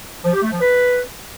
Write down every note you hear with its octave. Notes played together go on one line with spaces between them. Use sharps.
F3
G4
A3
F3
B4